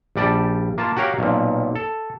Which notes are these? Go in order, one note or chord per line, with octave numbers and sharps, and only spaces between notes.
A#1 G3 D5 A5
A#3 F4 A5
F#4 G4 A#4 C#5 F5
B1 A#2
A4